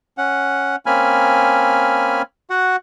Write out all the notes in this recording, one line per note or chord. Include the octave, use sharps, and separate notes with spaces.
C#4 F#5
A#3 C4 C#4 G#5 B5 F6
F#4 F#5